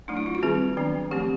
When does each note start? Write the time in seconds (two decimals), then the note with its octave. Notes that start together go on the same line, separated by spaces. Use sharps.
0.08 F#3 A3 D4 D#4
0.17 E4
0.26 F4
0.35 F#4
0.43 D#3 G3 C4 G#4
0.77 D#3 F#3 B3 D4
1.11 F3 A3 C4 G4